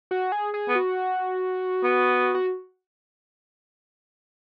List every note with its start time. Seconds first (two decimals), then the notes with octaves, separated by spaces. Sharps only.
0.11 F#4
0.32 G#4
0.54 G#4
0.69 B3
0.75 F#4
1.83 B3
2.34 F#4